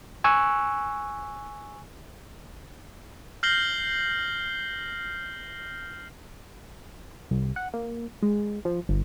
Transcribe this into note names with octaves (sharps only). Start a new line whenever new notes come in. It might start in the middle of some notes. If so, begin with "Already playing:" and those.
G#5 C#6 E6 F#6
F6 G6 A#6 C7 F#7 G7
C2
F#5
A#3
G#3
F3
G1